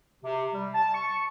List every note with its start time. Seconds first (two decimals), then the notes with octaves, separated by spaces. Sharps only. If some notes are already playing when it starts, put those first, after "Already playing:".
0.22 C3
0.54 G3
0.74 A5
0.94 C#6